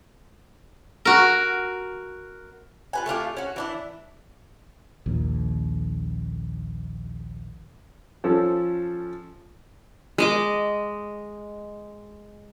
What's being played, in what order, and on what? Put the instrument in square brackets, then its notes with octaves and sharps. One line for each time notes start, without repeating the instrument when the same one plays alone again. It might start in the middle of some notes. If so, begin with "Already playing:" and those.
[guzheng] F#4 A#4
[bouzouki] F4 B4 G#5
A3 D4 F4 G4
C#4 F#4
E3 D4 E4
[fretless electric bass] A#1 D#2
[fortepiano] F3 C#4 A4
[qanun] G#3 D#5 D6